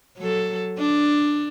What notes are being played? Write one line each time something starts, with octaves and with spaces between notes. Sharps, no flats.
F#3 A4
D4